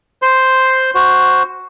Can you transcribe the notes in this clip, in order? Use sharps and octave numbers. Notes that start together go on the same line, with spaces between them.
C5 C6
F#4 C5